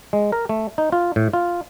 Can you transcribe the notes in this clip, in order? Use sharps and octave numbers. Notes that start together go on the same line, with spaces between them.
G#3
A#4
A3
D#4
F4
A2
F4